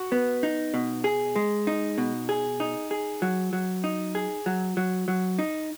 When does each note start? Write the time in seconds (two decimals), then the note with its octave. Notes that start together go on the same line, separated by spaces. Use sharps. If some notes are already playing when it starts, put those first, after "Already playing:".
Already playing: F#4
0.12 B3
0.43 D#4
0.74 B2
1.04 G#4
1.36 G#3
1.67 D#4
1.98 B2
2.29 G#4
2.60 D#4
2.91 G#4
3.22 F#3
3.53 F#3
3.84 D#4
4.15 G#4
4.46 F#3
4.77 F#3
5.08 F#3
5.39 D#4